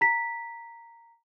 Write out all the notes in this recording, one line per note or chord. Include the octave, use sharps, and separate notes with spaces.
A#5 B6